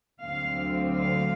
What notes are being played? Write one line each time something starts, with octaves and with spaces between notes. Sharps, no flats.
D2 D3 F#3 A3 C4 F5
F5